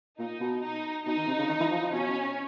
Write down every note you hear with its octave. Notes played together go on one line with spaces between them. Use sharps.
A#2 D#4
B2
D#4
B2 D#4
D#3
C3
C#3
D#3
E3
F3
F3
B2 C#4